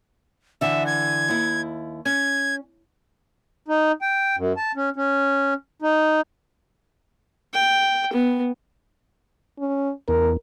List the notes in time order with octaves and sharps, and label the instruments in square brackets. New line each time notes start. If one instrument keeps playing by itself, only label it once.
[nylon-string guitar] D3 E3 [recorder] E5
[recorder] G#6
[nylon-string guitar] D#2 E4
[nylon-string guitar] C#4 [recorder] G#6
[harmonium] D#4
G5
F#2
A5
C#4
C#4
D#4
[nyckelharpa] G5
B3
[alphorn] C#4
[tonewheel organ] E2 [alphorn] A#4